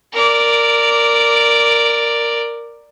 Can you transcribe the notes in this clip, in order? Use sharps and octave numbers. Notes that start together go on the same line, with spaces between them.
A#4 D5